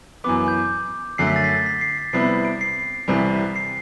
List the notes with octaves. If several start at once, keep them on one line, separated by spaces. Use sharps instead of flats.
F#2 E3 B3 D6
G6
F#2 D3 A3 C7
B6
A6
B6
B6
C7
C7
C3 G3 B3 E4 C7
C7
D7
C7
C2 C3 E3 G3 B6
B6
C7